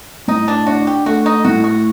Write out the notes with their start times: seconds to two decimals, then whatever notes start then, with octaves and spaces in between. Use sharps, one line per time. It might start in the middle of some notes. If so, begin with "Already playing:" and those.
0.28 A2 D#4
0.48 D4
0.66 D4 F#4
0.87 G4
1.06 A3 F#4
1.26 D#4
1.45 A2 F#4
1.64 F#4